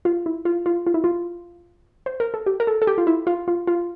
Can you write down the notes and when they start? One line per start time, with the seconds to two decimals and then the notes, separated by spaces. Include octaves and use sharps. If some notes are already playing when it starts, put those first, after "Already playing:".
0.05 F4
0.26 E4
0.45 F4
0.66 F4
0.87 F4
0.94 E4
1.04 F4
2.06 C5
2.20 A#4
2.34 A4
2.46 G4
2.60 A#4
2.67 A4
2.82 A4
2.87 G4
2.98 F4
3.07 E4
3.27 F4
3.48 F4
3.67 F4